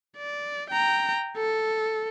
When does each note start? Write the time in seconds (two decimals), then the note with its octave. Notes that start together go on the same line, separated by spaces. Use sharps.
0.17 D5
0.70 G5 A#5
1.37 A4